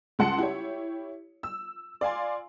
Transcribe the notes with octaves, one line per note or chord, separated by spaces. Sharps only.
C#2 G#3 F#5 A5 C6 C#7
E4 G4 C#5
E6
D5 F5 G#5 C6